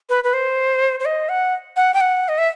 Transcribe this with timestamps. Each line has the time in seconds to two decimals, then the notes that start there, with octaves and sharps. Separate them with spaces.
0.09 B4
0.24 B4
0.33 C5
1.00 C5
1.05 D#5
1.29 F#5
1.77 F#5
1.94 G5
2.01 F#5
2.29 D#5
2.38 E5